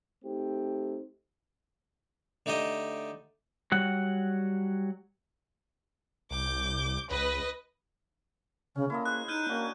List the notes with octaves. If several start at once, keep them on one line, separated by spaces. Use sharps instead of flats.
A3 C4 D#4 G4
D3 A3 D#4 G4 D#5
F#3 G3 F#5
C2 D6 G6
C#2 B4 D#5
C#3 C#4
A#3 E4 A4 D#5
G#4 C5 F#6
D#4 F6 G6 D#7
A#3 C#4 D4 F#4